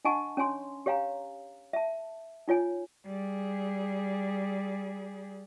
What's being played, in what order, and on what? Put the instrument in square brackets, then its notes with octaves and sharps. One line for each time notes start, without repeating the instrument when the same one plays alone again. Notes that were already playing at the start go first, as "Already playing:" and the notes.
[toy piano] D4 D#5 F#5 G#5 A5 C#6
C#4 C#5 G#5 C6
G4 C#5 F5 G#5 A#5
E5 A5
D#4 F4 C#5 G#5
[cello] G3 G#4